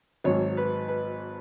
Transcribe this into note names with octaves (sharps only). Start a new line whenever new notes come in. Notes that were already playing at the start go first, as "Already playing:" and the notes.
G#1 G#2 F#3 C#5
B4
B4